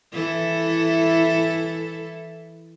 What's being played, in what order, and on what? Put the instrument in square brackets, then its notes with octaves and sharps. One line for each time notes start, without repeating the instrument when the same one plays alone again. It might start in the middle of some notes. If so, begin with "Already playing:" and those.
[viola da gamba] E3 E4 A4